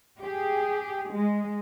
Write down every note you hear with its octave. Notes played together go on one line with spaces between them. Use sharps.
G4 G#4
G#3